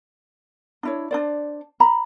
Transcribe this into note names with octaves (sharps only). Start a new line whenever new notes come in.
D4 E4 C#5
D4 C5 D5
A#5 B5